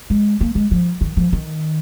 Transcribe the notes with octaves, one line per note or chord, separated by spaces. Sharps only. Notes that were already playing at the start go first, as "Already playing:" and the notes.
G#3
A#3
G#3
F3
D#3
F3
D#3